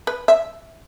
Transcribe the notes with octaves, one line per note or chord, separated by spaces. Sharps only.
B4
E5